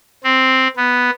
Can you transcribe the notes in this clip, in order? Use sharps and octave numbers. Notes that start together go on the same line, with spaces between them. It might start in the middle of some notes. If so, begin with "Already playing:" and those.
C4
B3